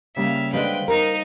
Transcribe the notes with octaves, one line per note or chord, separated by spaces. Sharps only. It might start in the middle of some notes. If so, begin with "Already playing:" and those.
C#3 G3 A#3 E5 F5
D3 G#3 D4 B4 C5 F5 G5
D#4 A#4